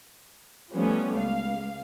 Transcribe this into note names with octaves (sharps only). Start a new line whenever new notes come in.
F3 G3 A3 B3 C#4
C#2 F5